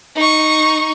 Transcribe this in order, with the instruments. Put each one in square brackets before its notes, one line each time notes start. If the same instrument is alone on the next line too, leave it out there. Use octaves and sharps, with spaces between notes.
[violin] D#4 C#6